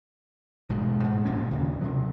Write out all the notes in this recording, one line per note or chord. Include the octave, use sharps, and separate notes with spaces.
E1 G#2 B2
G#2
E1 A#2 A#3 C#4
D#2 C#3
C3 F#3